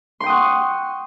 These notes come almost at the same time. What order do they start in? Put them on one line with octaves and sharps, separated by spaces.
C6 G5 D#6 F#5 C#6